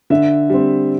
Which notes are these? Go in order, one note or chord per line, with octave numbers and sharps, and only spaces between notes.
D3 E5
G3 C4